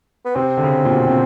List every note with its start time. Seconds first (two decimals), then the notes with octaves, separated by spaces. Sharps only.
0.25 B3
0.36 C3 C4
0.57 D3
0.63 C#3
0.85 A#2
0.91 B2
1.08 C3